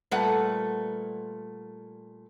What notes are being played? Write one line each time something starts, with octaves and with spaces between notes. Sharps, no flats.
A#2 G3 A3 B4 F#5